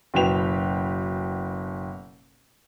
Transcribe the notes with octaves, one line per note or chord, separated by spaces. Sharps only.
F#1 B2 B4 G5 F7